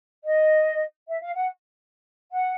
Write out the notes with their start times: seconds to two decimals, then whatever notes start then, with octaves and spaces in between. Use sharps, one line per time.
0.23 D#5
1.08 E5
1.21 F5
1.35 F#5
2.32 F#5